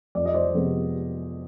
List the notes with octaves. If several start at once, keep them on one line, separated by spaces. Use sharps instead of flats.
F2 D5
D#5
C5 D5
C3 F3 G#3 B3